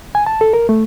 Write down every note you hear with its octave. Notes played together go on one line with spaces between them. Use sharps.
G#5
A5
A4
A#4
A3